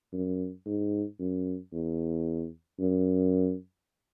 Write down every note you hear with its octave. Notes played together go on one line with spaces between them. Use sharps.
F#2
G#2
F#2
E2
F#2